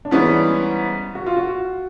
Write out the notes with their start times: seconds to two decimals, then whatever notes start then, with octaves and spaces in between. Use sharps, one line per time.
0.05 D4
0.11 G#2 E3 G3 B3 C#4
1.15 F#4
1.26 F4
1.37 F#4